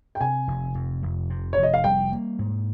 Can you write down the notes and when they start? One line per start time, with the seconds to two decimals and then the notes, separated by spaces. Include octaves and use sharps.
0.15 G5
0.21 C3 G#5
0.48 F1
0.74 F2
1.03 F1
1.30 C3
1.53 F1 C#5
1.63 D#5
1.74 F5
1.84 G3 G5
2.12 A#3
2.39 G#2